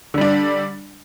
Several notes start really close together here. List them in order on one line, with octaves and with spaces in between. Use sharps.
D3 G3 D4